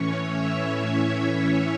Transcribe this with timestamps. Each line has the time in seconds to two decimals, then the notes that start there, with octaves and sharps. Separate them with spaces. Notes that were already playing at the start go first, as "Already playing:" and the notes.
Already playing: A2 E3 C#4 C#5
0.31 E5